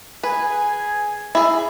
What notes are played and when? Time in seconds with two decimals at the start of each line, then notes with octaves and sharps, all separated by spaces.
0.23 G#4 B4 G#5
1.35 E4 G#4